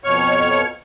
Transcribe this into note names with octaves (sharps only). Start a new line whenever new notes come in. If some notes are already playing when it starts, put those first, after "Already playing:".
F2 B2 C#5 C#6 F6